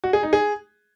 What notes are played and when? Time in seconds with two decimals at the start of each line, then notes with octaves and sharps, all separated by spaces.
0.04 F#4
0.13 G#4
0.23 D#4
0.33 G#4